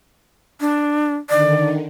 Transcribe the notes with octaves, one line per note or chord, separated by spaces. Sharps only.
D4
D3 D#3 D5